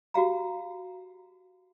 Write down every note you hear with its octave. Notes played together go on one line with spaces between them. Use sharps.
F#4 G4 F5 A#5